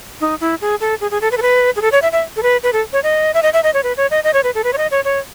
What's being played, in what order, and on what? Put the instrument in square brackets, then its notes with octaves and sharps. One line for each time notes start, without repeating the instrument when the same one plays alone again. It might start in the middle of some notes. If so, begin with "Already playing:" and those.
[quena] D#4
E4
G#4
A4
G#4
G#4
A4
B4
A4
B4
G#4
A4
C#5
E5
E5
A4
B4
B4
A4
C#5
D#5
E5
D#5
E5
D#5
C#5
B4
C#5
D#5
D#5
C#5
B4
A4
B4
C#5
D#5
C#5
C#5